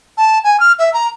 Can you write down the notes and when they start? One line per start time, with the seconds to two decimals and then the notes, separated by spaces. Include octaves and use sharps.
0.17 A5
0.44 G#5
0.60 F6
0.79 E5
0.94 A#5